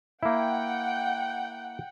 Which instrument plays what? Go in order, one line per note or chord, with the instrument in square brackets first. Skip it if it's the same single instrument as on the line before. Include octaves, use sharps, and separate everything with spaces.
[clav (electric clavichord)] A#3 E4 [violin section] F#5 G5